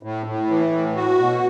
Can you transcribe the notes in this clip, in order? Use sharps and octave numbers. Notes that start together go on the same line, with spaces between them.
A2
A2
E3
A2
F#4
B2